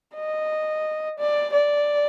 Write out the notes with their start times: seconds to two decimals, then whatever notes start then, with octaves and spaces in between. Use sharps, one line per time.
0.15 D#5
1.19 D5
1.53 D5